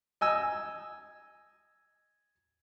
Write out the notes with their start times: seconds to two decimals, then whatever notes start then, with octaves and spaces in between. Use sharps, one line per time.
0.21 D#5 G#5 E6